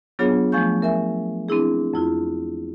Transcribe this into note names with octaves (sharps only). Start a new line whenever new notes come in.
F#3 B3 D4 F4 G#4 C#5
F3 A3 F5 G#5 C#6 G6
A#4 E5 G#5
C4 D4 E4 G#4
F2 E4 F4